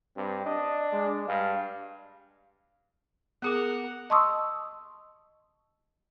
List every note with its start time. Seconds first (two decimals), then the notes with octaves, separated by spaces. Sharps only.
0.17 G2 C4
0.46 D4 D#5
0.93 G#3
1.28 G2 F5
3.42 B3 G#4 A#4 F#5 D6
4.10 D#5 A5 C6 C#6 D#6 E6